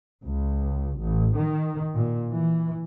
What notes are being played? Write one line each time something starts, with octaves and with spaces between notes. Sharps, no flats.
C#2
A1
D#3
A#2
E3